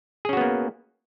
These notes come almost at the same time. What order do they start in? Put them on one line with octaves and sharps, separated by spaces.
G#4 C#4 F#4 B3 A#3